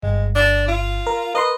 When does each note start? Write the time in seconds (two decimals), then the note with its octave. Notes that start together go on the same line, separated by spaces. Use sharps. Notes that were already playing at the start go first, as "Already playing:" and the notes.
0.03 G1 G#3
0.35 D4
0.68 F4
1.07 A#4
1.35 A#4 B4 D#5 C6